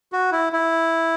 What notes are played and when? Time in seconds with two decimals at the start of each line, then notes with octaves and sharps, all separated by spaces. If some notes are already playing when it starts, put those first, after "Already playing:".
0.12 F#4
0.32 E4
0.53 E4